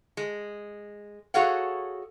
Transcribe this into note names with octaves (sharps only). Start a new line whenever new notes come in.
G#3
F#4 G#4 A4 C#5 F5 F#5